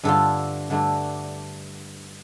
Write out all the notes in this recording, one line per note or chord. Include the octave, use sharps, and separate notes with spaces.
G2 D3 A3 D4 F4 A4
G2 D3 A3 D4